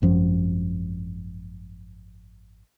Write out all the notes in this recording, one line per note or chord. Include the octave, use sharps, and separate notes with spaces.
G#1 F#2 F3